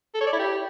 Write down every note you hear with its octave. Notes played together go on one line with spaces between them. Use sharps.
A4
C#5
D5
E4
G4